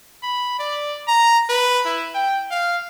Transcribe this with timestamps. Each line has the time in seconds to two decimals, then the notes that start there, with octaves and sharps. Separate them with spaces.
0.23 B5
0.59 D5
1.08 A#5
1.49 B4
1.86 E4
2.14 G5
2.51 F5